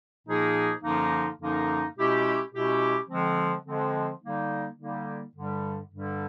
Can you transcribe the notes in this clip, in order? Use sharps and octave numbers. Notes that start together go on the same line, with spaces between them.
A#2 F3 A#3 D#4 G#4
F#2 D3 F3 A#3 D#4
F#2 D3 F3 A#3 D#4
B2 G#3 C#4 E4 G4
B2 G#3 C#4 E4 G4
D3 F3 G#3 C4
D3 F3 G#3 C4
D3 G3 A#3 D#4
D3 G3 A#3 D#4
G2 D3 G3
G2 D3 G3